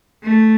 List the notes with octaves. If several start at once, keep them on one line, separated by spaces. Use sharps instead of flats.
A3